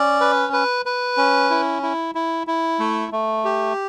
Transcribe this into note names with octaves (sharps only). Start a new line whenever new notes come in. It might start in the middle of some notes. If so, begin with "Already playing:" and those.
Already playing: C#4 D5
B4
B4
B4
C#4
E4
E4
E4
E4
A3
A3
G4